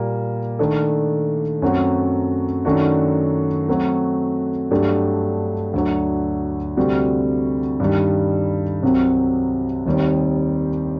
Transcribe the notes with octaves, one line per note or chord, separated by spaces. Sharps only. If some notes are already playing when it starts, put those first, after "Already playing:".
Already playing: A#2 G3 A#3
D#3 A3 D4 A4
F#2 F#3 A3 C4 F#4
F#2 D#3 A3 D4 F#4
F#3 A3 C4 F#4
G2 F#3 A3 D4 G4
D2 D3 F#3
D2 C3 G3 C4 F#4
G2 D#3 G3
C2 C3 F#3 C4
D#2 D#3 G3 C4